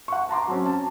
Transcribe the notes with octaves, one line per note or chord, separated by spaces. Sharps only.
F#5 C#6
A5 A#5 C6 D6
F#3 C4 C#4
A5